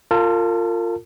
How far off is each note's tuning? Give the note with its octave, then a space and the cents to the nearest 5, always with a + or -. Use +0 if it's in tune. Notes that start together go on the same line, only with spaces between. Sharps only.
F4 +0 A#4 -35 A5 +0